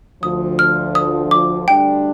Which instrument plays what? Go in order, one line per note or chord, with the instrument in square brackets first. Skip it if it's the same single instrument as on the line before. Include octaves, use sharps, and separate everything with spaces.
[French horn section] D2 D3 F3 [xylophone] D#6
[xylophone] F6
D#6
D6
[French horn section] D2 D3 G3 D4 [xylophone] G5